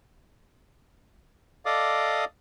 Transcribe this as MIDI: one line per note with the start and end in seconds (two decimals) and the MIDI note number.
1.66 2.25 69
1.66 2.25 74
1.66 2.25 75
1.66 2.25 77
1.66 2.25 86
1.66 2.25 87